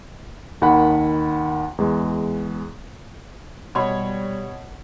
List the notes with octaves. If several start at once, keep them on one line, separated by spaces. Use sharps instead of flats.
D#2 D#3 F#5 B5
E2 G#3
B2 G3 C#5 B5 C6